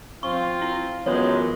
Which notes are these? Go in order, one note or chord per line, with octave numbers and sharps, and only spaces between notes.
C4 F4 C#6
E4
F#2 E3 G#3 B3 F4 C#5